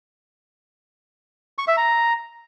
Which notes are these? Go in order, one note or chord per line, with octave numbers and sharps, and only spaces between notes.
C#6
E5
A#5